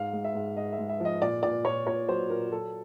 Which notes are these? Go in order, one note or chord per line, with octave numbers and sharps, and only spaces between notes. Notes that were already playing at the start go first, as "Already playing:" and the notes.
Already playing: G#2 F5
G#3
E5
G#2
G#2 D#5
E5
G#3
E5
F3 D#5
A#2 D5
A#2 D5
A#2 C#5
A#2 C#5
F#3 C5
A#2 A#4
F#3 A4